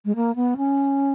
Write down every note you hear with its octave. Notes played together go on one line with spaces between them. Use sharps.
G#3
A#3
B3
C#4